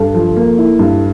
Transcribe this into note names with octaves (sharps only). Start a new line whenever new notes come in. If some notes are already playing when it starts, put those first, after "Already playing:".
Already playing: G2 A4
F3
A#3
E4
G2